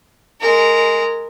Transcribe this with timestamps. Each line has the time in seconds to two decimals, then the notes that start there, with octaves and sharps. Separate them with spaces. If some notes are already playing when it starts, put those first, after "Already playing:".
0.41 G#3 A#4